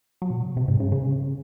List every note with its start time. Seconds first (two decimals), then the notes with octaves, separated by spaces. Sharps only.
0.22 F#3
0.30 A#2
0.40 C3
0.47 C#3
0.57 C3
0.68 G#2
0.80 C#3
0.92 C#3